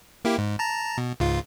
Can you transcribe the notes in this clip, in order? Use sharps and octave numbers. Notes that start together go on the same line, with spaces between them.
A#3 E4 G4
G#2
A5 A#5
B2
C#2 G#2 F4